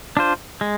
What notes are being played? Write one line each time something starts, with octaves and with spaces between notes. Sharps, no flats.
D4 F4 C5
G#3